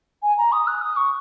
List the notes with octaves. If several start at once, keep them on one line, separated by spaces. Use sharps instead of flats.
G#5
A#5
D#6
F#6
D#6
C#6